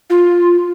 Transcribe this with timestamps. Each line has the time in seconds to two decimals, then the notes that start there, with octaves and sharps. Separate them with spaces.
0.10 F4